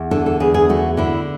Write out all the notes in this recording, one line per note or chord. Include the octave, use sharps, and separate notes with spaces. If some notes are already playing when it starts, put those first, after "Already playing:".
Already playing: E2
D3 A4
A4
E2 G#4
G#4
A3 F#4
D3 E4